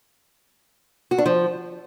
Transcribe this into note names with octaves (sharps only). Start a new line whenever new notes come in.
F#4
D4
F3